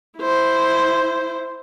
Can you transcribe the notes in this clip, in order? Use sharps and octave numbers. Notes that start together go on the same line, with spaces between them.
E4 C5